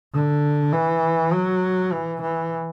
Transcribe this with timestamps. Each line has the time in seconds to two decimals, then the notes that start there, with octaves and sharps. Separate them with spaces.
0.14 D3
0.73 E3
1.33 F#3
1.93 E3
2.22 E3